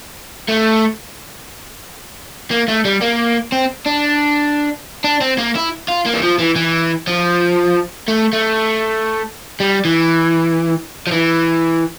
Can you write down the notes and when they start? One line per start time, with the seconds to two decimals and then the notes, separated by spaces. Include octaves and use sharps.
0.48 A3
2.50 A#3
2.68 A3
2.85 G3
3.01 A#3
3.52 C4
3.86 D4
5.04 D4
5.21 C4
5.38 A#3
5.55 E4
5.88 F4
6.06 A#3
6.14 E3
6.23 F3
6.39 E3
6.56 E3
7.07 F3
8.08 A3
8.33 A3
9.60 G3
9.85 E3
11.07 F3
11.12 E3